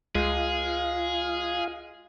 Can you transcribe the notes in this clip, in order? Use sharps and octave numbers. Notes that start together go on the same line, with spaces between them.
C#2 G#3 F4 G#4 F5